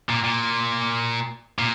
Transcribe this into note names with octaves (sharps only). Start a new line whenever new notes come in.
A#2
A#2
A#2